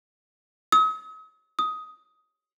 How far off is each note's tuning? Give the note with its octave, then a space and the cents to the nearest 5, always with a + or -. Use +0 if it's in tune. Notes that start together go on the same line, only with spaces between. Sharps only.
D#6 +45
D#6 +10